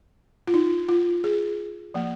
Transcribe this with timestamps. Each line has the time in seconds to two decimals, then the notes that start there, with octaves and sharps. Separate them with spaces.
0.47 F4
0.54 D#4
0.89 F4
1.24 G#4
1.94 F3 A#3